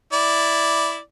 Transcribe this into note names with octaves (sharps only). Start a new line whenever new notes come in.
E4 D5